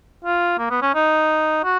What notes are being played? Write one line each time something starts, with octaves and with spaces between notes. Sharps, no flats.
F4
A#3
B3
C#4
D#4
F#4